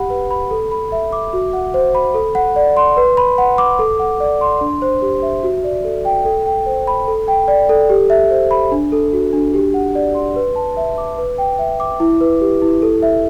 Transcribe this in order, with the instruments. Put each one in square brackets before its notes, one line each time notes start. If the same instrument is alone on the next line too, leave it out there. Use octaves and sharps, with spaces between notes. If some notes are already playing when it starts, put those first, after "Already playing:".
Already playing: [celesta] G4 F#5 B5
B4
B5
A4
B5
E5
D6
F#4
F#5
C5
B5
A4
F#5
D5
C6
B4
B5
F#5
D6
A4
F#5
D5
C6
D4
C5
G4
E5
F#4
D5
A4
G5
A4
G5
C5
B5
A4
G5
D5
A4
G4
E5
C5
B5
D4
A4
F#4
D4
G4
F#5
D5
C6
B4
A5
E5
D6
B4
G5
E5
D6
E4
B4
G4
E4
A4
E5